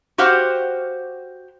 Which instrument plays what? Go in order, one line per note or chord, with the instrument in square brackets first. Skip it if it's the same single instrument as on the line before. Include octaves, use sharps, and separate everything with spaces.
[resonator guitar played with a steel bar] F#4 G4 C5 F5 F#5